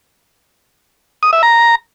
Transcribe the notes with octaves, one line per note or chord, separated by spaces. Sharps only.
D#6
E5
A#5